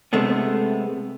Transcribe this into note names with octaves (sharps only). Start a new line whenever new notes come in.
C3 G#3 A3 B3